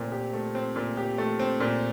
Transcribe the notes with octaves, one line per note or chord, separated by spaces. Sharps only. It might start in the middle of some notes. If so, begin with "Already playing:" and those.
Already playing: A#2 A3 C4
G4
A3
C4
A#2
G4
A3
C4
A#2